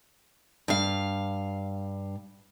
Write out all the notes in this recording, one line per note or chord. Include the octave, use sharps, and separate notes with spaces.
G2 F5